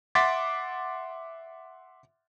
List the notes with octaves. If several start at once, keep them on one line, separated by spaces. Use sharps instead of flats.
E5 F#5 C6 D6 A6 B6